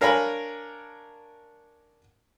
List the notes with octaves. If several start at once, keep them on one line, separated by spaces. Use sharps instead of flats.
D4 A#4 C#5 F5 G#5 B5